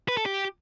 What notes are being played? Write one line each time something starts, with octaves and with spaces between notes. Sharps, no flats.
B4
A4
G4